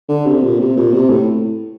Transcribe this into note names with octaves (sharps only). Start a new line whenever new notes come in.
D3
C3
A#2
C3
A#2
C3
A2